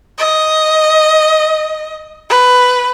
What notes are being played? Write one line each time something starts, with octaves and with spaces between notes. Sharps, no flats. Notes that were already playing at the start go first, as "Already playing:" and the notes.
D#5
B4